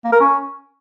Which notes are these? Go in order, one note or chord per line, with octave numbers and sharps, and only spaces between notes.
A#3
A#4
C#4